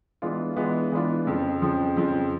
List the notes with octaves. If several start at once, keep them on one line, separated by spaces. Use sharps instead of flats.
E3 G#3 B3 D4 F4
E3 G#3 B3 D4 F4
E3 G#3 B3 D4 F4
F2 C#3 F3
F2 C#3 F3
F2 C#3 F3